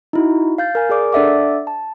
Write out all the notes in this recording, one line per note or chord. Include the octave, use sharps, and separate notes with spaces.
D#4 E4 F#4
F5 G6 A6
A#4 G#5
G#4 A#4 D5 D6
D4 A4 D5 E5 F#5 D6
A5